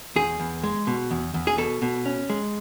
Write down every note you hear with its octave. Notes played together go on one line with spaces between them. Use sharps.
E2 G#4
E2
G#3
B2
E2
E2
G#4
B2 A4
B2
C#4
G#3